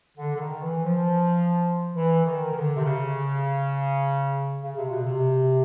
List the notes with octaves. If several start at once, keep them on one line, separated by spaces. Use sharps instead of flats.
D3
D3
D#3
E3
F3
E3
D#3
D#3
D3
C3
C#3
C#3
C3
B2
C3